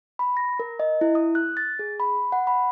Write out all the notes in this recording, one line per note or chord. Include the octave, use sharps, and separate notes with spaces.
B5
A#6
A#4
D#5
E4
D#6
F#6
A6
G#4
B5
F#5
B5